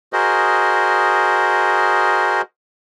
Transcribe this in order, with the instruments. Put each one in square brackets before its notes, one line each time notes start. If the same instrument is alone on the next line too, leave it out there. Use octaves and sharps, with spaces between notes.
[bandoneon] F#4 G#4 A#4 C5 D#5